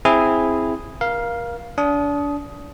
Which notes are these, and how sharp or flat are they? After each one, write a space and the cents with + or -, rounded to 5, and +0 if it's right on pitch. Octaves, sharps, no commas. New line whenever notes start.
C4 +5 E4 +0 G#4 +0
A#4 +30 F5 +0
D4 -30 D#6 +10